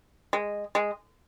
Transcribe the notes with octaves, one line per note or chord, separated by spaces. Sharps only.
G#3
G#3